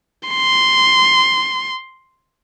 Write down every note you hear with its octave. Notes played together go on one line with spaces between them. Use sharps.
C6